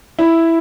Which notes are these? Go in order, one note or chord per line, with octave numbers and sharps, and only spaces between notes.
E4